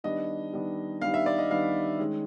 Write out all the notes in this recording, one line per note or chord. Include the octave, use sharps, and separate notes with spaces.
D#3 G3 B3 D4 D#5
D#3 G3 B3 D4
D#3 G3 B3 D4 F5
E5
D5
D#5
D#3 G3 B3 D4 F5
D#3 G#3 C#4